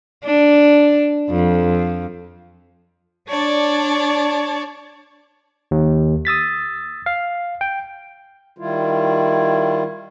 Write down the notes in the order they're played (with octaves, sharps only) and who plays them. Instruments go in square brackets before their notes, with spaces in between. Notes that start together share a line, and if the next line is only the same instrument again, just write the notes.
[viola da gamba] D4
F2
[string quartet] D4 C#5 D5 A5
[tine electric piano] D#2
D#6 E6 A6 B6
F5
G5
[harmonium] D#3 G3 E4 F4